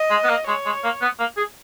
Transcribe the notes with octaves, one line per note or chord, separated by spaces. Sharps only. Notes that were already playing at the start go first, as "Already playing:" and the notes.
Already playing: D#5
G#3
B3
A#3
G#3 C#5
G#3
A#3
B3
A#3
G#4